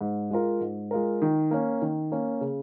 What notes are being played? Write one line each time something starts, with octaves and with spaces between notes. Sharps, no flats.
G#2
G#3 F4 A#4
G#2
G#3 F4 A#4
D#3
A#3 C#4
D#3
A#3 C#4
C#3